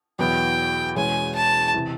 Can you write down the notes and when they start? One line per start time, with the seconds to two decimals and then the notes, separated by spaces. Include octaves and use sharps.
0.19 E2 B2 F#3 B3 E4 G5
0.96 E2 B2 G#3 C#4 G#5
1.35 A5
1.74 C3 E3